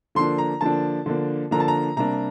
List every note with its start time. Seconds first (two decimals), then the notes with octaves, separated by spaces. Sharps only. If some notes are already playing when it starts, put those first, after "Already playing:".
0.15 D3 F3 A#3 D4 C6
0.38 A#5
0.61 D3 F3 A#3 D4 A5
1.06 D3 F3 A#3 D4
1.51 D3 F3 A#3 D4 A#5
1.60 A5
1.68 A#5
1.97 C3 G3 A#3 D4 A#5